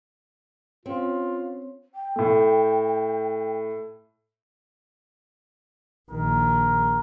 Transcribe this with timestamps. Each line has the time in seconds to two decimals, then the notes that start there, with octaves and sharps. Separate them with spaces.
0.86 C4 C#4 F4
1.94 G5
2.16 A2 A3
6.11 A#1 D#3 A#4